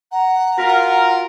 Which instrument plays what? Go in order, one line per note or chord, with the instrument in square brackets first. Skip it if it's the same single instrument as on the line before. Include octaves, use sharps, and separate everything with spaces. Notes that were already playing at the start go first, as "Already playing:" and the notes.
[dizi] F#5 [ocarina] A#5
[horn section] F4 A#4 [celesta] F#4 A#6 B6